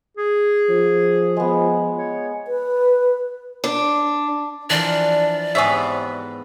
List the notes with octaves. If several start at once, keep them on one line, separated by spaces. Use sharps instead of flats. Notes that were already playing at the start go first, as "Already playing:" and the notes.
G#4
F3
G#3 B3
C#5
B4
D4
E3 F3 D4 A#4 D5
G#2 C3 B3 G#4 C#5 E5